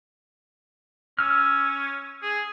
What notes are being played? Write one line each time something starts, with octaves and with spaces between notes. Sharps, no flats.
C#4 E6 F6
G#4